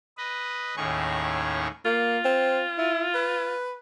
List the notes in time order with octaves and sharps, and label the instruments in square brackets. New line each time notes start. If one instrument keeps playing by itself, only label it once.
[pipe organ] B4 D#5
D#2 A2 D#3 C#4 G#4 C#6
[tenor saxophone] A#3 [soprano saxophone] F4
[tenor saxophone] C4
E4
B4